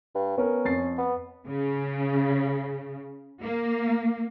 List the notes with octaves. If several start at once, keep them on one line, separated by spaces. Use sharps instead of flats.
G2
B3 C#4 A#4
F2 A6 C7
B3
C#3
A#3